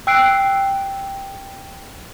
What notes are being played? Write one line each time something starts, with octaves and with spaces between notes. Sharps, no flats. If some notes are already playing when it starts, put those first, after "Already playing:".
G5 E6 F#6 C7 D7